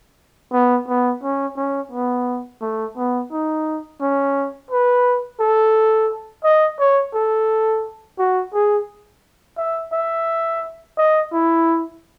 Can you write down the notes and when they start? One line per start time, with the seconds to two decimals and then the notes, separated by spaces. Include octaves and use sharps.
0.53 B3
0.88 B3
1.23 C#4
1.57 C#4
1.92 B3
2.61 A3
2.97 B3
3.32 D#4
4.01 C#4
4.71 B4
5.40 A4
6.44 D#5
6.79 C#5
7.14 A4
8.18 F#4
8.54 G#4
9.58 E5
9.93 E5
10.97 D#5
11.33 E4